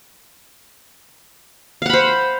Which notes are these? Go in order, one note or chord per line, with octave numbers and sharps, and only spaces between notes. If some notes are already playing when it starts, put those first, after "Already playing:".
C5 F5 F#5 B5